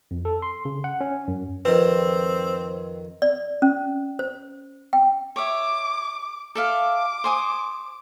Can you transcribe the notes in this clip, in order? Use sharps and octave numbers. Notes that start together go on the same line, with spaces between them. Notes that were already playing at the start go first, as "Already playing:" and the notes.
F2
A4
C6
C#3
F#5
C#4
F#2
F2 D#3 C4 B4
D5
C#4
C5
G5
C#5 E5 D6
A4 E5 F5 D6
C5 G#5 D#6